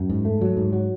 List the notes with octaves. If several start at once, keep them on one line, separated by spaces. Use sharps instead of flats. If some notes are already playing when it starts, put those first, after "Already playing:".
Already playing: F#2
G#2
A3
F#3
G#2
F#3